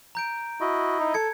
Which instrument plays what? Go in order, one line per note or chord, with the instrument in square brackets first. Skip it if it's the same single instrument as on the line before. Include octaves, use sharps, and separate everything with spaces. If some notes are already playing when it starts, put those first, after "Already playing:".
[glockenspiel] A#5 G6 D7
[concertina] E4 D#5 [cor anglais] F#4
[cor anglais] D#4
[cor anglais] A4 [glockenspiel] G#6 C#7